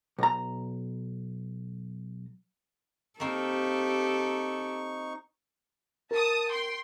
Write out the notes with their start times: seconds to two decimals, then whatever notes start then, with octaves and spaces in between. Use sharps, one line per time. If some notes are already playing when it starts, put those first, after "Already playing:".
0.19 B1 A#5
3.20 A#3 C4 D#4 G4 A4 C#6
6.11 A#4 A5 D#6
6.51 G5 C6